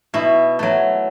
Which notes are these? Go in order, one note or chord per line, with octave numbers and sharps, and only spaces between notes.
B2 E4
F#3 A3